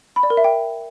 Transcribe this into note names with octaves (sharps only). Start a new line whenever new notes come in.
B5
D5
A#4
E5
G5